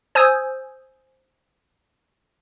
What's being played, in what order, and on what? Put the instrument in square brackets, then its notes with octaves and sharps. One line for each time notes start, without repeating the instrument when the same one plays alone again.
[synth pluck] C5 G#5 D#6 E6 G6 G#6